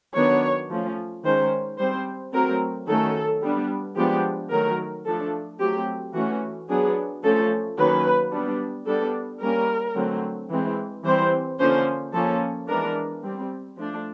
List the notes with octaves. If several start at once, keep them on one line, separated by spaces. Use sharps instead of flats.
D#3 F#3 B3 D4 C#5
F3 A3 C#4
D#3 G#3 C#4 C5
G3 C4 C5
F#3 A3 C4 A#4
D#3 F#3 A3 C#4 A4
G3 B3 D4
F3 G#3 B3 D4 G4
D#3 F#3 A3 A#4
F3 A3 D4 A4
F#3 A3 C4 G4
E3 A3 C#4 F#4
F#3 B3 D4 G#4
F3 A3 C#4 A4
D#3 F#3 A#3 C#4 B4
G3 B3 D4
G3 B3 D4 A4
G3 A#3 C#4 A#4
D3 F#3 A3 C4
E3 G#3 C4
E3 G3 C4 C5
D3 F3 A#3 C#4 C5
F3 A#3 C#4 A4
E3 G#3 B3 D4 A#4
G3 C4
F3 A3 D4